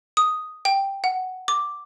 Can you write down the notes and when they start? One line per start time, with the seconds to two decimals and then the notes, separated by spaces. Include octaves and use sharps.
0.17 D#6
0.65 G5
1.04 F#5
1.48 D6